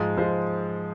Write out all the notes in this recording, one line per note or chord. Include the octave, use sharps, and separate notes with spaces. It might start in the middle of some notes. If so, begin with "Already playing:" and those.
Already playing: G#2 F3 G#3
G#2 F3 G#3 C5